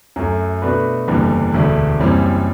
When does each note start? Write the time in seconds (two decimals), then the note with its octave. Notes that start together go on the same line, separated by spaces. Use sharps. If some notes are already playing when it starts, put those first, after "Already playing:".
0.16 F#2 F#3 A3
0.62 B2 A3 D4 F#4 B4
1.08 F#1 E2 D3 G3
1.54 E1 D2 D3 A3 D4
1.99 F#1 F#2 E3 G3 C4